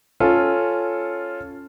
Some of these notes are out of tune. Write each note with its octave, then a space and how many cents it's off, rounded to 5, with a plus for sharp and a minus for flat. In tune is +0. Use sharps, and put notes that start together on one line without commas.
C#4 +0 F4 +0 A4 +0